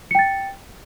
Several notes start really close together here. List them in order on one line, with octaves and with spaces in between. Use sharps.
C#7 G5 A6